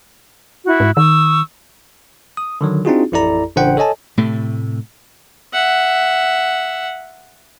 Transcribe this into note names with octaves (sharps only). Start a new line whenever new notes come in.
E4 F#4
G#2
D#3 C#6 D#6 E6
D#6
D3 D#3 F#3
C4 D4 D#4 F4 F#4 G#4
A1 F2 E4 A4 D5 A#5
A1 C#3 D4 C5 F#5 G5
A4 C#5 D#5 G#5 A5
A2 C3 A3
E5 F#5